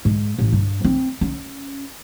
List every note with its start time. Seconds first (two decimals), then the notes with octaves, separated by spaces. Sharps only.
0.05 G#2
0.39 A1
0.53 G2
0.84 C4
1.21 C#4